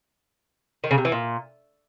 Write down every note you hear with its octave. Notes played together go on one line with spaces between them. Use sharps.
D#3
C#3
C3
E3
A#2